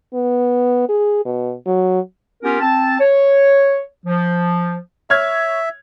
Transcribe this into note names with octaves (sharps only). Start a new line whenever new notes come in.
B3
G#4
B2
F#3
B3 C#4 F4 G4 A#4
C4 A5
C#5
F3
C#5 E5 F6 G#6